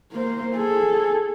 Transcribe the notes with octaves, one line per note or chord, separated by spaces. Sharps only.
A#3 C5
G#4 A4